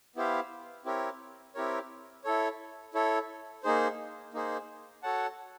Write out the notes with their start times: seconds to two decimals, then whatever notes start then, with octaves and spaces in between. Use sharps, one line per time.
0.16 B3 E4 G4 C5 F5
0.85 C4 E4 G4 A#4 C#5
1.55 C4 E4 G4 A#4 C#5
2.24 E4 A4 C#5
2.94 E4 A4 C#5
3.63 A#3 D#4 G#4 C5
4.34 A#3 D#4 G#4 C5
5.03 F#4 A4 C#5 F#5 A5